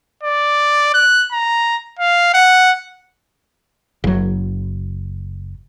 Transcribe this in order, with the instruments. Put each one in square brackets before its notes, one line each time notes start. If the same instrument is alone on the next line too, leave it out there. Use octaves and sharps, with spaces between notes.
[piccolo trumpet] D5
F#6
A#5
F5
F#5
[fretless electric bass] F#1 F#3